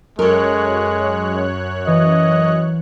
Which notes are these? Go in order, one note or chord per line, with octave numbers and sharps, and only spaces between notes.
F#2 G#3 A4 A#4 C#5 C#6 F#6 D7
E3 D#5